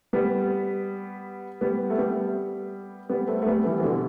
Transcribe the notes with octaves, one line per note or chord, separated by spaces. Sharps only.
G3 B3
G3 B3
A3
G3 B3
G3 B3
A3 C4
A3
G3 B3
E3 G3
E3
B2 D3